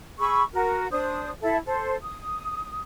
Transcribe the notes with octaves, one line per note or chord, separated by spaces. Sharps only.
G#4 B5 C#6 E6
F#4 A#4
D4 C5 D#6
E4 A4 E5
A4 C5
D#6